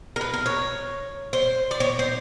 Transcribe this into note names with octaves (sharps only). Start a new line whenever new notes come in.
A#4
B4
A#4
C#5
C5
D5
C#5
C5